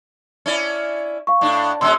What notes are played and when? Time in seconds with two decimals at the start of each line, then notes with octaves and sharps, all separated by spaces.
0.46 C#4 E4 D5
1.27 F5 C#6
1.41 A2 D4
1.81 B2 G#3 C#4 C6 E6